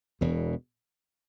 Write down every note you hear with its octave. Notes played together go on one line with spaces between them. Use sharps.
E1 E2 B2